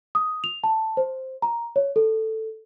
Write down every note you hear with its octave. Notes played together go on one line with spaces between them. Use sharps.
D#6
F7
A5
C5
A#5
C#5
A4